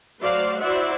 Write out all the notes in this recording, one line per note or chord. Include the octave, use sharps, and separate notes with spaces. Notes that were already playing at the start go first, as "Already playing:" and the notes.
F#3 A3 F#4 C5 D5 F5
E4 F#4 C5 D5 E5 F#5